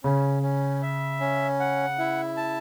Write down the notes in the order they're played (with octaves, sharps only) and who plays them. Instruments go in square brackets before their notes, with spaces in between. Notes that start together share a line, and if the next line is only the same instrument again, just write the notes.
[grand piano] C#3 [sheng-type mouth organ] C#4
[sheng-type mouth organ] C#4
E5
C#4
F#5
E4
A5